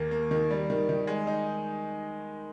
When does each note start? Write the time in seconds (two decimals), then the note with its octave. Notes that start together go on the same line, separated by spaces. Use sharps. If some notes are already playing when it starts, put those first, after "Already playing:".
Already playing: D#2 A#3
0.11 A#3
0.31 D#3
0.50 G3
0.70 D#3
0.89 D#3
1.07 G#3
1.27 D#4